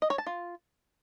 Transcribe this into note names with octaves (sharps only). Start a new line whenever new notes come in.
D#5
C#5
A5
F4